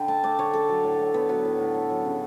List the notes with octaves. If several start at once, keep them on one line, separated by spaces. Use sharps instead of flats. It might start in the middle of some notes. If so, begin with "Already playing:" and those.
Already playing: D3 G5 B5
A3 A5
A3 D5
D3 C#5
A3 A4
F#3
A2
A2
A3 B3
F#3 B3
A2
A2
A3
F#3
C#3